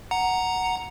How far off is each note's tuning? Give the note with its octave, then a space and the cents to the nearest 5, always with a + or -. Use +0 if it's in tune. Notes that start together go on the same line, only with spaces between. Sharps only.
F#5 +0 A#5 +0